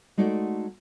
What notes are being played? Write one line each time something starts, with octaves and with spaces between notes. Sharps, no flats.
G#3 A3 D#4 F#4 D5